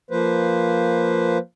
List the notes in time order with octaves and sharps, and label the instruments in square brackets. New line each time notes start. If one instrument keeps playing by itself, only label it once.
[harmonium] F3 A#3 B4 C5